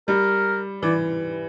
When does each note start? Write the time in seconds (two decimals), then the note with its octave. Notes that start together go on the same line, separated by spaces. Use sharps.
0.08 G3 A#4
0.82 E3 D5